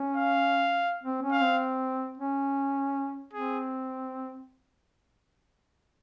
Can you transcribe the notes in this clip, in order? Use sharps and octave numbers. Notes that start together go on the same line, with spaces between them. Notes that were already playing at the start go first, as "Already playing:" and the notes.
Already playing: C#4
F5
C4
C#4
F5
C4
C#4
C4 G#4